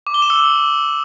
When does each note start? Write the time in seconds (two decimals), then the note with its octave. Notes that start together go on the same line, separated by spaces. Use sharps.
0.07 D6
0.14 G7
0.22 E7
0.30 E6